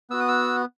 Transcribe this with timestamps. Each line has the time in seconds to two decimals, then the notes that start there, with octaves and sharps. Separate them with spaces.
0.10 B3 F#4 E6
0.20 D#6
0.28 E6